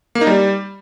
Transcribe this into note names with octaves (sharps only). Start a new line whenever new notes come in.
A#3
D#4
G3